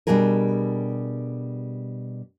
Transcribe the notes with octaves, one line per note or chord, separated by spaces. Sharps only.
B2 G3 D4 G4 G#4 A#4